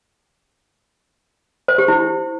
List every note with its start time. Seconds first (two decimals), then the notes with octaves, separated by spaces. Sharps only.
1.68 C5
1.78 G4
1.88 E4